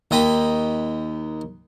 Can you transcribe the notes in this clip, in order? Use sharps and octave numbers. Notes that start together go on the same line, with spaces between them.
D#2 D#5 G5 B5